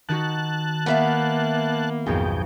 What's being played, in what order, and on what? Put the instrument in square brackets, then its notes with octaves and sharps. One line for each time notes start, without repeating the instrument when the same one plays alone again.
[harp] D#3 D#4 F#4 [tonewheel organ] A5 F#6
[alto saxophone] A#3 [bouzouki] B3 E5 F5
[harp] B1 F2 G#2 [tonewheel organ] G#4 G5